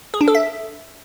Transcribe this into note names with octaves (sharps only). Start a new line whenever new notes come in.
G#4
D4
A4
E5